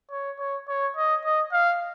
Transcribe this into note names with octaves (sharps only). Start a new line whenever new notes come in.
C#5
C#5
C#5
D#5
D#5
F5